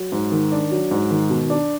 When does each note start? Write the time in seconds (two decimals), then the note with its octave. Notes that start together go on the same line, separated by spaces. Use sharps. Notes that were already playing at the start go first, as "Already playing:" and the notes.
Already playing: F#3
0.12 G#2
0.32 D#3
0.52 D4
0.71 F#3
0.91 G#2
1.10 D#3
1.30 B2
1.50 D4